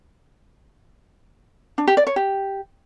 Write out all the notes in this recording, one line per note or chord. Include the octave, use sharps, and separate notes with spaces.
D4
G4
D5
C#5
G4